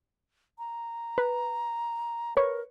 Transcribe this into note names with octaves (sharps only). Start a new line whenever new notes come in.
A#5
B4
A#4 B4 C#5 C#6